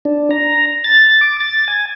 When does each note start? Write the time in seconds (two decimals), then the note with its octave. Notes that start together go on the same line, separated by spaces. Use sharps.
0.05 D4
0.31 A#5
0.84 A6
1.21 D6
1.40 A6
1.68 G#5